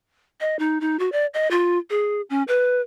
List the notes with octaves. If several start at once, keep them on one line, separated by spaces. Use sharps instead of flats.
D#5
D#4
D#4
F#4
D5
D#5
F4
G#4
C#4
B4